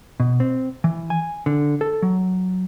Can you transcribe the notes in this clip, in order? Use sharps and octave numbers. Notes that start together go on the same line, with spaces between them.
B2
C4
E3
G#5
D3
A4
F#3